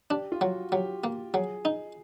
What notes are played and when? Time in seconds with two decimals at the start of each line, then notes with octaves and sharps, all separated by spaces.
0.10 D4 G4
0.32 F4
0.41 F#3 F#4
0.72 F#3 G4
1.04 A#3
1.34 F#3 G#4
1.65 D#4